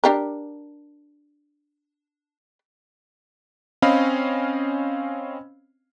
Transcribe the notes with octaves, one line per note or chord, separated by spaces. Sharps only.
D4 G4 A#4
C4 C#4 D#5 F5 B5